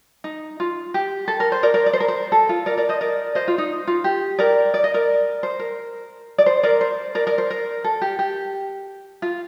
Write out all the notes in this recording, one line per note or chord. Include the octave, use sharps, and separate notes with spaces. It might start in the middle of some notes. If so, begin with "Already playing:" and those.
D#4
F4
G4
A4
A#4
C5
A#4 D5
A#4 D5
D5
C5
A#4
C5
A4
F4
A#4 D5
A#4 D5
C5 D#5
A#4 D5
C5 D#5
F4
D#4
F4
G4
A#4 D5
D5
D#5
A#4 D5
C5
A#4
D5
C5
A#4 D5
C5
A#4 D5
A#4 D5
C5
A#4
A4
G4
G4
F4